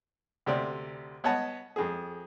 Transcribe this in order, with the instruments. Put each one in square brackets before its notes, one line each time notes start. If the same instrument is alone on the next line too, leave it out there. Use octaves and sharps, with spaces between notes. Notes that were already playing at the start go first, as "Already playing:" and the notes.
[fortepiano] D2 C3 D5
B3 C#5 D#5 F#5 A5
F2 G#4